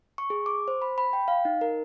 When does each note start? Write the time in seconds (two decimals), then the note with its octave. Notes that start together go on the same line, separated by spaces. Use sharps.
0.18 C#6
0.30 G#4
0.46 D6
0.68 C5
0.82 B5
0.98 B5
1.13 G5
1.28 F5
1.45 D#4
1.61 A#4